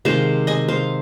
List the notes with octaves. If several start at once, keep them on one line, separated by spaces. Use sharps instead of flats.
C3 D#3 G#3 C5 F5
D#5 G#5
C5 F5